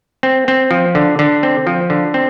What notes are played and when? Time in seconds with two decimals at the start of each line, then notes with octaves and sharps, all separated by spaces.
0.23 C4
0.48 C4
0.71 F3
0.95 D3
1.19 D3
1.43 C4
1.67 F3
1.90 D3
2.14 C4